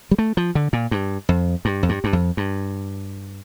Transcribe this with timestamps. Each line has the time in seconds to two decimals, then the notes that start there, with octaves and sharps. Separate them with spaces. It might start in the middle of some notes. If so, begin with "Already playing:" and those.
0.11 G3
0.18 A3
0.37 F3
0.55 D3
0.73 A#2
0.91 G2
1.29 F2
1.65 G2
1.83 F2
1.89 G2
2.04 G2
2.13 F2
2.37 G2